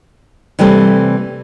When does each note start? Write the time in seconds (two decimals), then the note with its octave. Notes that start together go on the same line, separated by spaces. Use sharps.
0.59 C3 E3 G3 A3 C4